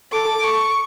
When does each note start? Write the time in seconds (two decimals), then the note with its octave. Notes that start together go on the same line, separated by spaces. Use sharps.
0.12 A4 D6
0.44 C#6